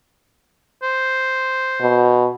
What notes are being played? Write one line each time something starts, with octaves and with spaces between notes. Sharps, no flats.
C5
B2